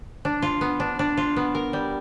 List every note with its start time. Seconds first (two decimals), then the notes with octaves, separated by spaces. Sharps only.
0.25 D4
0.42 F4
0.61 B3
0.80 D4
0.99 D4
1.17 F4
1.36 B3
1.55 A#4
1.73 G3